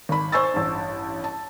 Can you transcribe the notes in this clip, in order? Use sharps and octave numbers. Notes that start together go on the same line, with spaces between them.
G#1 B5
C5 G#5 C#6 E6 A6
A1 G2
A5